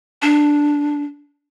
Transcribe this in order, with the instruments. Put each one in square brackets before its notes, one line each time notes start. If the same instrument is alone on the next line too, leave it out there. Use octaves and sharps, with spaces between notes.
[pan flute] D4